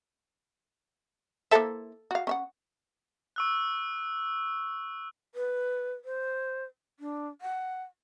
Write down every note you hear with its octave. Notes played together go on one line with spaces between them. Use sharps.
A#3 E4 A4 C5 E5
F#4 F5
C#4 E5 F#5
C#6 E6 F#6
B4
C5
D4
F#5